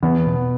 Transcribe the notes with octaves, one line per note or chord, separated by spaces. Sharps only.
E2 B3
B2